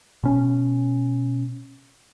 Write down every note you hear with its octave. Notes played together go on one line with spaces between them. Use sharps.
B2 C#4